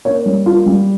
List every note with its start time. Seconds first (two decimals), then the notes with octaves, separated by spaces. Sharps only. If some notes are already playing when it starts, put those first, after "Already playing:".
0.05 A#3 C#5
0.26 G3
0.46 A#3 F4
0.66 G3